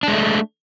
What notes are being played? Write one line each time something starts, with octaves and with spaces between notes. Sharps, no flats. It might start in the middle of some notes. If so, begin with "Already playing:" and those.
G#3 A3 D4